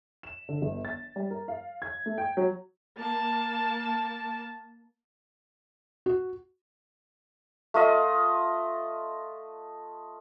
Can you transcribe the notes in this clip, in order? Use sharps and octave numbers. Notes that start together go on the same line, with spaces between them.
E7
D3
G1
A6
G3
A#4
F5
G#6
A3
G5
F#3
A#3 A5
F#4
A3 F4 D#5